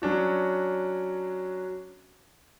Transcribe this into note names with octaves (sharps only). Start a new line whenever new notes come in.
F#3 C#4 D4 F#4